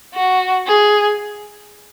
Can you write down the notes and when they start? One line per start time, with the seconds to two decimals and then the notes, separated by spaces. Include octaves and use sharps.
0.14 F#4
0.67 G#4